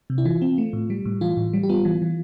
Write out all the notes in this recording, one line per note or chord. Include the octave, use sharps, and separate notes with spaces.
C3
E4
E3 F4
C4
A3
A2
G3
A2
E3 F4
A2
G3
G4
B3 F4
E3
E3